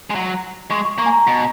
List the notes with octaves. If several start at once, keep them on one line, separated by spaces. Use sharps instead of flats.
G#3
F#3
G#3 C#6
C#6
A#3 C#6
G#5
A#5
B2